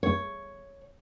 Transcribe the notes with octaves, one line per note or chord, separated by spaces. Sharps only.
C#5